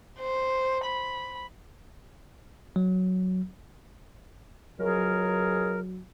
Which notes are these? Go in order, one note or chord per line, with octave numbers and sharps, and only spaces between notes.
C5
B5
F#3
C#2 F#3 G#4 A#4